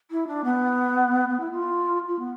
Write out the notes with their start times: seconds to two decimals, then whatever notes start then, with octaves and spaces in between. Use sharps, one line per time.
0.10 E4
0.27 D4
0.44 B3
1.28 B3
1.39 E4
1.51 F4
2.07 F4
2.18 B3